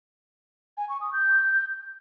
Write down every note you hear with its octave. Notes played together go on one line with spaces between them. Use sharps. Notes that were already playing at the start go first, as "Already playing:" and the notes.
G#5
C#6
D#6
G6